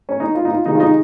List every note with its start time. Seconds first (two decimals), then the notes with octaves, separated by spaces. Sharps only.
0.09 C#4
0.20 D#4
0.35 F4
0.45 D#4
0.51 F4
0.65 C3 D#3 G#3 D#4
0.75 F4
0.80 D#4